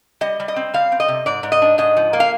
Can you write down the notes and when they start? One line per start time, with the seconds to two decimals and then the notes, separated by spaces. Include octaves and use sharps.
0.21 G3 D#5
0.40 G3
0.48 D#5
0.56 C4
0.74 G3 F5
0.92 C4
1.00 D#5
1.08 C3
1.26 G#2 D5
1.43 G#2
1.52 D#5
1.62 D4
1.78 G#2 D#5
1.97 F3
2.13 A#3
2.20 F5